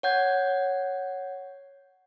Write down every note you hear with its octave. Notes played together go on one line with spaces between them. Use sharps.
C#5 F#5 G6 G#6